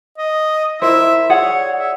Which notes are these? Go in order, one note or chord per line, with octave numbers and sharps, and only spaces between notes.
D#5
E4 A#4 C5 E5
G#4 C#5 D5 F#5
E5